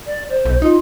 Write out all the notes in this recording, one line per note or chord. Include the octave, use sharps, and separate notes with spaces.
D5
C5
B1
D#4 F4